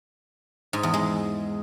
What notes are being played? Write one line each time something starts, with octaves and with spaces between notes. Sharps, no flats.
G#2
E2
G#3